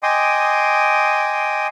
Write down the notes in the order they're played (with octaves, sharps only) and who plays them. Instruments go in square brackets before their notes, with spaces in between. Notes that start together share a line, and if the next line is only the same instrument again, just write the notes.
[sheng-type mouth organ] D#5 G5 G#5 C6 D6 D#6